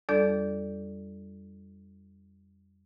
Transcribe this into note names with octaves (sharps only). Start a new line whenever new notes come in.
F2 G3 D4 A4 D5 G6